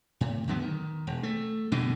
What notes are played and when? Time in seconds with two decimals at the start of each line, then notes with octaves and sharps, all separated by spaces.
0.21 A2
0.47 E2 D3 F#3 B3
0.62 D#3
1.07 E1
1.23 A3
1.72 E1 G2 B2 D3